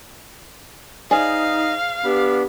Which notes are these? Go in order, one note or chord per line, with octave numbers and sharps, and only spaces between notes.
D#4 G#4 C5 D5 D#5 F5
B3 D4 G4 B5